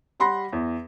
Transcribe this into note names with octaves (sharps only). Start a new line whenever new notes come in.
G3 F#5 B5 C6 A#6
E2